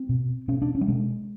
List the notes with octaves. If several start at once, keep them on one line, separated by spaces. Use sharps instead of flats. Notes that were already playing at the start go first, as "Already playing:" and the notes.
Already playing: C4
B2
B2 C#4
D4
C#4
G3
B2 G#3